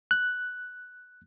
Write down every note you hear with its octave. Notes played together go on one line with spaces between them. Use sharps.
F#6